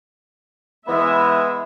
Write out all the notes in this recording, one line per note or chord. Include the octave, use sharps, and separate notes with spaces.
E3 G#3 B3 E5